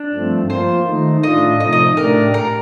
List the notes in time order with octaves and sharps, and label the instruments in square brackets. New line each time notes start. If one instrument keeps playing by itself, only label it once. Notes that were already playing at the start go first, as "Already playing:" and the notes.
Already playing: [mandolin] D4
[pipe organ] G2 F3 A3 C4
[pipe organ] F3 A#3 F4 [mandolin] C5
[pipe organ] D#3 A3 D#4
[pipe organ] A2 A3 D4 F4 [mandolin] D#5
[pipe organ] C3 F3 A3 D#4 [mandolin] D#5
[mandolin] D#5
[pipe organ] A2 A3 D4 G4 D5 [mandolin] A#4
[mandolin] A#4